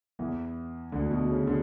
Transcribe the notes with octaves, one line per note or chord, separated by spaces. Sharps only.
E2 E3
D2 D3
B2
C#3
D3